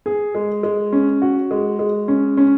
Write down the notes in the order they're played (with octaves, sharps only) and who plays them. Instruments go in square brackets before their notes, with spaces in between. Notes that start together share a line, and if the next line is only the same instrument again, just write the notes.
[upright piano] G#4
G#3
G#3
C#4
F#4
G#3
G#3
C#4
C#4